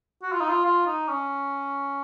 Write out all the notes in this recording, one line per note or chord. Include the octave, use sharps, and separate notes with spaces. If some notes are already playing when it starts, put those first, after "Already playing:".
F#4
F4
D#4
F4
F4
D#4
C#4